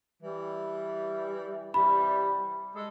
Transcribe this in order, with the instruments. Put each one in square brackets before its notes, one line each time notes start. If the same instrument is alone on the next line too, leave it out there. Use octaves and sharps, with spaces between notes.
[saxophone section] E3 G3
[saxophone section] C3 E3 G3 [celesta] B5
[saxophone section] G#3 A4